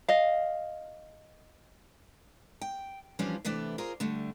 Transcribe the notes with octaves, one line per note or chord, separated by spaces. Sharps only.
D#5 F5
G5
E3 F3 G3 C#4 D4 F4
C3 E3 A3 B3 D4
F4 G#4 A#4 C5
D3 G3 A3